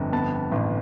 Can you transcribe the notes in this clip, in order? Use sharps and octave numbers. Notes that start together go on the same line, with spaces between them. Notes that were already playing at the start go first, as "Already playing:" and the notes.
Already playing: G1 F2
B3 A5
A1